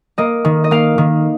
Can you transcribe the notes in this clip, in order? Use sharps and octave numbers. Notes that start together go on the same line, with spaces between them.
A#3 D#5
D#3
D#5
A#3 F5
D#3